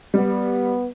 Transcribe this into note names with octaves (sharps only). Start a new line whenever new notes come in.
G3 B3